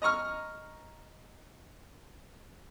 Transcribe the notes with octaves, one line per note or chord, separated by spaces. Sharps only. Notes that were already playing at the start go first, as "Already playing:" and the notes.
D#5 A#5 C#6 F6